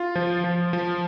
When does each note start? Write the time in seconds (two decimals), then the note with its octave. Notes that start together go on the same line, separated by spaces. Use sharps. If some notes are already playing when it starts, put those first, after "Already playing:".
Already playing: F4
0.15 F3
0.44 F3
0.73 F3